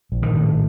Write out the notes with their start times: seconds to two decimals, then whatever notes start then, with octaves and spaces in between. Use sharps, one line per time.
0.12 A#1
0.23 D#3
0.34 A2